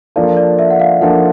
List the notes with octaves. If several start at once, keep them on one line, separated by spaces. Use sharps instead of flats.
F3 A#3 D4 F4 A4 D5
D5
E5
F#5
F5
F3 A#3 D4 F4 A4 F#5